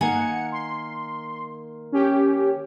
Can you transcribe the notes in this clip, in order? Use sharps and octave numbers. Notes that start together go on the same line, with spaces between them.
D#3 A#3 F#5 G#5 C#7
C6
C#4 G4